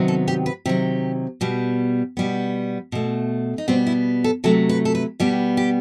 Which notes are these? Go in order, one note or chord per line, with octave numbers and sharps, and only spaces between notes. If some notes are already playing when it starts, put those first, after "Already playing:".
Already playing: C3 D#3 F#3 B3
A4
G4
B4
C3 D#3 F#3 G4
B2 G3 B3
B2 G3 B3
B2 A3
D#4
B2 G3 B3 C4
E4
A4
C3 F#3 A3 A4
B4
A4
B4
B2 G3 B3 G4
G4